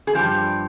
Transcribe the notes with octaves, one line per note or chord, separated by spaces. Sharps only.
G#4
G2 F3 G4